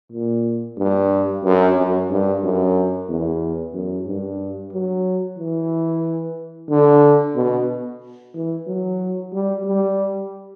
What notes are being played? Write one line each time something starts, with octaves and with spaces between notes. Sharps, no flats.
A#2
G2
F#2
F#2
G2
F#2
E2
F#2
G2
F#3
E3
D3
B2
E3
F#3
G3
G3